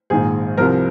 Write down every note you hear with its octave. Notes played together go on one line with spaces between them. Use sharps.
A#1 G#2 D#3 G#4
C2 C3 F3 A#4